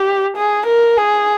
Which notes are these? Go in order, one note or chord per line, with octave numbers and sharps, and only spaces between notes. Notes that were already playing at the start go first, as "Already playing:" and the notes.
Already playing: G4
G#4
A#4
G#4